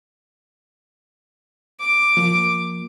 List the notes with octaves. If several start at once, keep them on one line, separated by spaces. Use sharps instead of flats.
D6
F3 A#3